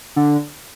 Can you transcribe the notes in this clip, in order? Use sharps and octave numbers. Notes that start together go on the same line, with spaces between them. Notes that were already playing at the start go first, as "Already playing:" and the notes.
D3